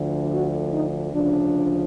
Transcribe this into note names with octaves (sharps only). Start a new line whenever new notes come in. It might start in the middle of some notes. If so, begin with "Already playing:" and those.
Already playing: D2 D3 F3
F#4
D#4
D2 C#3 F3 D4